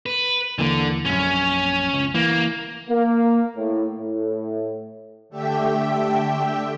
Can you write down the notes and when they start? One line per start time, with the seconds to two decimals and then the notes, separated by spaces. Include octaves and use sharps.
0.06 B4
0.59 D#2 D3 E3 A#3
1.05 A#1 F#2 C#4
1.93 C#2
2.15 E3 A#3
2.90 A#3
3.56 A2
3.99 A2
5.29 D3 A3 G4 E5 G5